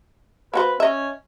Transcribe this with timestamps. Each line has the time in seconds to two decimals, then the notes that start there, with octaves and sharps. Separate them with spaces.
0.54 A#3 F#4 B4 C5
0.80 C#4 D#5 E5